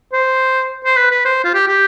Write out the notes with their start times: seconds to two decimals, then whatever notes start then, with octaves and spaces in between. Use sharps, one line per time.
0.13 C5
0.85 C5
0.97 B4
1.11 B4
1.25 C5
1.44 F4
1.54 G4
1.68 G4